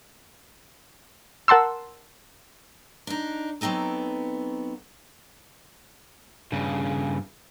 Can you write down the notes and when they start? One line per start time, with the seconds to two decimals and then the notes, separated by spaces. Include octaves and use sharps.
1.48 A#4 F#5 A5 C6 E6
3.07 D4 D#4
3.61 F#3 B3 C4 D#4 A4
6.52 G2 C#3